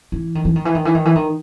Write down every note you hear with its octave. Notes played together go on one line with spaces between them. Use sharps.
E3
D#3
E3
D#3
E3
D#3
E3
D#3
E3
D#3